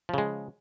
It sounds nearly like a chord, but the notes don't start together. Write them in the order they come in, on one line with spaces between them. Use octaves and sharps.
F3 C#3 G#3